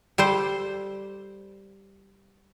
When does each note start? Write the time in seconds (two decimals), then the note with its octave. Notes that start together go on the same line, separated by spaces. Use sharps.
0.18 G3 A4 C5